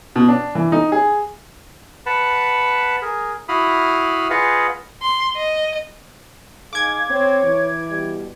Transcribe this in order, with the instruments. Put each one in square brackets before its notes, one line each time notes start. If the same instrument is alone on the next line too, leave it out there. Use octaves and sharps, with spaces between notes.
[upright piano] B2
D4
E3
D#4
G#4
[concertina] B4 F#5 A5 B5
G#4 A#4
E4 F#4 F5 B5 D#6 F6
F4 G#4 B4 D#5 F5 F#5
[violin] C6
D#5
[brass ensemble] D#4 G#4 F5 [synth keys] D6 G#6
[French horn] C4 [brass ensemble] C#5
[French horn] E3
[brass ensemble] B2 G3 G4